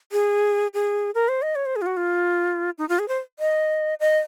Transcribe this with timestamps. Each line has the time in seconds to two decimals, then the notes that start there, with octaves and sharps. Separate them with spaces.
0.12 G#4
0.74 G#4
1.15 A#4
1.28 C5
1.42 D#5
1.55 C#5
1.66 C5
1.76 G#4
1.82 F4
1.86 F#4
1.97 F4
2.78 D#4
2.89 F4
2.99 G#4
3.08 C5
3.39 D#5
4.00 D#5